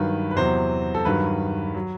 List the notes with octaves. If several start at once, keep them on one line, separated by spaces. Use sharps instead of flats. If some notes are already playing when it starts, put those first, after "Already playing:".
Already playing: G2 D#3 F#3 B4
B4
E2 C3 F#3 C5
A4
G2 D#3 F#3 B4
F#3